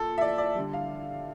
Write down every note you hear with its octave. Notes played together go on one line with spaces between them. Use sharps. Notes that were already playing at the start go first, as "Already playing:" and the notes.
Already playing: A#2 A4
E5
D5
D5
D3 G3
F5